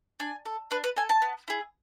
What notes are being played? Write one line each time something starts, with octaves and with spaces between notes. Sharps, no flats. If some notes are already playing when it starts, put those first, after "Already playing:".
D4 G#5
A4
D4 B4
B4
A4 G#5
A5
B3
E4 G#4